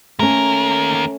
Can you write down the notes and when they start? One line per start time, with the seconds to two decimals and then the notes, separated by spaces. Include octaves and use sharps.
0.19 D#2 A3 C#4 A#4